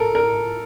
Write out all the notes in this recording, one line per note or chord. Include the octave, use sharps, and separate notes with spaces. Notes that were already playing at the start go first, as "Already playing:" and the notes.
Already playing: A4 A#4
A#4